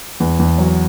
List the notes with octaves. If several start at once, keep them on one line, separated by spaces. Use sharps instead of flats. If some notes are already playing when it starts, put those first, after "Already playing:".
E2
E2
F#3